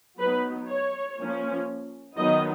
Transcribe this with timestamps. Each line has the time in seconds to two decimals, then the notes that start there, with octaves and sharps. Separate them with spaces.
0.19 F#3 B3 D#4 B4
0.68 C#5
1.18 F3 A#3 C#4
2.17 D#3 F#3 B3 D#4 D#5